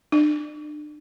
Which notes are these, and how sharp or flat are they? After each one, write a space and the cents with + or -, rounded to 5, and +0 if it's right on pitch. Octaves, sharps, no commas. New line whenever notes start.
D4 +35